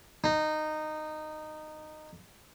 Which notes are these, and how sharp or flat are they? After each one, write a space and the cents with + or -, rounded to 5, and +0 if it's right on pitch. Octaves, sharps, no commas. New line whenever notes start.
D#4 -15